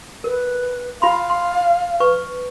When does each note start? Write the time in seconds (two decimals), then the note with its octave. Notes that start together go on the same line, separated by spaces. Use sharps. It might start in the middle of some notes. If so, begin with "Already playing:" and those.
0.24 A#4 B4
1.02 F4 F5 B5 C6
1.30 C6
2.00 B4 C#6